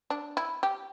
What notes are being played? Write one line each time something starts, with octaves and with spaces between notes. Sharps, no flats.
D4
E4
G4